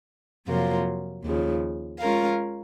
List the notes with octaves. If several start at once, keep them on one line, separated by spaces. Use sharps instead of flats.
F2 C3 F#3 A#3 F4
D#2 C#3 F3
G#3 C#4 F4 A#4 F5